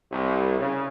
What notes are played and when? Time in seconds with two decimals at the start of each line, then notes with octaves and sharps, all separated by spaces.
0.12 C2
0.59 C#3